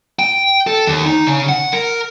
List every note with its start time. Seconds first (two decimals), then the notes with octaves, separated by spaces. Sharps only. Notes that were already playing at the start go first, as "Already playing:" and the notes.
0.19 G5
0.67 A4
0.87 D#2
1.06 D#4
1.27 C#3
1.49 F#5
1.73 A#4